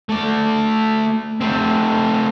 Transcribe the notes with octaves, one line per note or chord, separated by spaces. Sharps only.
A3 D5
A3 C4